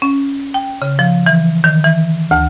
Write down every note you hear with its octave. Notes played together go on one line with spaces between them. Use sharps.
C#4
G5
C#3
F3
E3
D#3
E3
D2